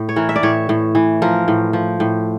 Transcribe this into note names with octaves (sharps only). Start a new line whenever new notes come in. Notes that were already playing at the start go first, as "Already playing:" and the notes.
Already playing: A2
C#5
E3 A#4
E5
D5
A2 C#5
A2
E3
F3 A#4
A2
F3
A2